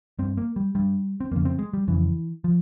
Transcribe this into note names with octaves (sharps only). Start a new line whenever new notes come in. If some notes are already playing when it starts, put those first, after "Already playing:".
G2 C4
A#3
G3
G2 G3
C4
F2 C#3 A#3
C4
G#3
G3
F2 C#3 E3
F3